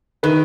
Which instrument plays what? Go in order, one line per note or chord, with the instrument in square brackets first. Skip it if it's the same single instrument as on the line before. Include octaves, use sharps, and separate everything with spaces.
[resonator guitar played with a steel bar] D#3 [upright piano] B4